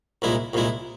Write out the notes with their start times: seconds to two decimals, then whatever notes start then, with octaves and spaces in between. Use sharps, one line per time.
0.22 C2 A#2 G#3 E4
0.53 C2 A#2 G#3 E4